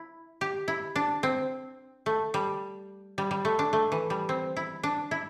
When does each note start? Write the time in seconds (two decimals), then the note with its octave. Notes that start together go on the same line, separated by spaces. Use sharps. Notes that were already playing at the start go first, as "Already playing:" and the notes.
Already playing: E4
0.41 G4
0.68 E4
0.96 D4
1.23 C4
2.06 A3
2.34 G3
3.18 G3
3.31 G3
3.45 A3
3.59 D4
3.73 A3
3.92 E3
4.10 G3
4.29 C4
4.57 E4
4.83 D4
5.11 E4